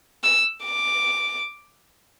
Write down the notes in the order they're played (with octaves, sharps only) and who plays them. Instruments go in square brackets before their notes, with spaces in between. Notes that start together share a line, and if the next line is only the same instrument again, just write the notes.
[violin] E6
D6